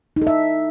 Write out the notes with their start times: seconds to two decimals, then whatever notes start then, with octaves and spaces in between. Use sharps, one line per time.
0.16 D#4
0.22 A4
0.27 E5